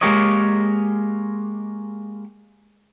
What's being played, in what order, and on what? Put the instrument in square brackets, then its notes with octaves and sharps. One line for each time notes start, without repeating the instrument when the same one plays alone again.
[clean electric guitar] G#3 A#3 G4 A#4 C#5 D#5